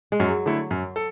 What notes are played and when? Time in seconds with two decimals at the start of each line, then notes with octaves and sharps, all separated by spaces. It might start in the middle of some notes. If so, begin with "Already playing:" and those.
0.12 G#3
0.20 F#2 F#3
0.46 D3 A3 E4 A4
0.71 F#2
0.96 A4